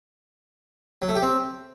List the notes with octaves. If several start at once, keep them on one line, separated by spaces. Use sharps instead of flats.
F#3
A3
G4
C4